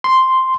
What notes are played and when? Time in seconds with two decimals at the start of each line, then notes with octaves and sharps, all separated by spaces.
0.04 C6